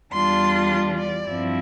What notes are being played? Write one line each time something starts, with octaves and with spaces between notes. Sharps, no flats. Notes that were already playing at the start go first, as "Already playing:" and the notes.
E2 E3 G3 D4 F4 C6
D5
G2 F3 C4 E4